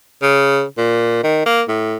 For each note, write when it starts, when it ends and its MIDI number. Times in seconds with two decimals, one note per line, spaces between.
0.23 0.64 49
0.77 1.22 46
1.23 1.44 51
1.46 1.62 58
1.68 1.97 45